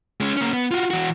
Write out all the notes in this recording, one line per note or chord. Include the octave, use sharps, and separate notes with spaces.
G#3 C#4
A#3 C#4
B3
F4 F#4
E3 F#4